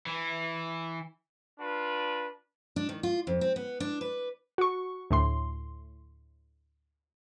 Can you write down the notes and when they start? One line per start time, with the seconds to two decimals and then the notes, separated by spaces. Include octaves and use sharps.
0.06 E3
1.59 D4 F4 B4
2.76 D4
2.89 D#3
3.03 F4
3.27 F2
3.41 C4
3.56 B3
3.80 D4
4.01 B4
4.58 F#4 C#6
5.11 D2 A2 C6